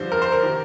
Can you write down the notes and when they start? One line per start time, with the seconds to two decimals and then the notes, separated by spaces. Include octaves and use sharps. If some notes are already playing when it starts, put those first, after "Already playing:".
Already playing: G2 D3 F3 C5
0.12 A#4
0.22 C5
0.32 A#4
0.42 C3 D#3